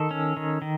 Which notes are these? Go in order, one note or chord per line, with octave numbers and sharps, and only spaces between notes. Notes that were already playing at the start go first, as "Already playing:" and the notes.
Already playing: D#3 A4
C#4
D#3
D#3